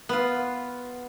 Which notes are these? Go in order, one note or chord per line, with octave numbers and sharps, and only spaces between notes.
B3 F4